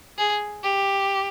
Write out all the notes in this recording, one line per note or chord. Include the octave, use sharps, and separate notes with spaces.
G#4
G4